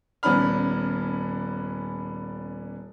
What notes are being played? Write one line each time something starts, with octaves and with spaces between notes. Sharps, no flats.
D#1 B3 C#4 D4 B5 F6